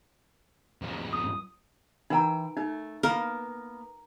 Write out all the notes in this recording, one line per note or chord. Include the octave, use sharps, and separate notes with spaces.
G2 F3
D#6
E3 D#4 A#4 G5 A#5
A3 D#4
A#3 B3 A#4